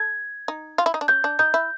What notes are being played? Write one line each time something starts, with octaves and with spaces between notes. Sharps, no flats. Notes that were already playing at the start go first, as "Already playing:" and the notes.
Already playing: A4 G#6
D#4
F4
E4
D#4
D4
C#4 G6
D4
D#4 G6
E4